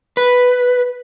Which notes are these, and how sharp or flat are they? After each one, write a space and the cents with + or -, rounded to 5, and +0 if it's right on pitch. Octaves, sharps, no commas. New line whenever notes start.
B4 +0